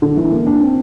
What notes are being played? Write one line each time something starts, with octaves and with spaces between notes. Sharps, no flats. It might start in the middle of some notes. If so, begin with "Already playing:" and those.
D3
E3
A#3
D4
C4